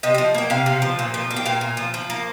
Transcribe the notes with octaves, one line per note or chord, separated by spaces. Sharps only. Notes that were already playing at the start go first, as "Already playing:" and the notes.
C3 D#5
F3 D#5
A#3 G5
C3 F5
C3
F3
A#2
F3
A#3
G5
A#2 F5
A#2
F3
F3
A#3